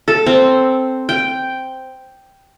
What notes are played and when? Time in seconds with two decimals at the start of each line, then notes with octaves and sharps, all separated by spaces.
0.08 A4
0.26 C4
1.09 G5